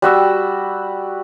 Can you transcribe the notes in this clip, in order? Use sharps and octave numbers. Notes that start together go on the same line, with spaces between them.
G3 F#4 E6